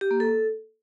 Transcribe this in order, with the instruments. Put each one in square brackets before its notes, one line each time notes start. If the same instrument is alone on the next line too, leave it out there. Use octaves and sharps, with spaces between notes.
[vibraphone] G4
A#3
A4